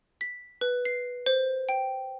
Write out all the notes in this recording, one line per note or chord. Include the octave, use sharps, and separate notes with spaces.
B6
B4
C7
C5
G5